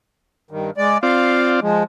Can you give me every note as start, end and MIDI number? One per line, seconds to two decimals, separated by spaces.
0.51 0.70 43
0.51 0.70 51
0.77 0.98 56
0.77 0.98 74
1.03 1.60 60
1.03 1.60 65
1.03 1.60 74
1.03 1.50 77
1.62 1.83 53
1.62 1.83 56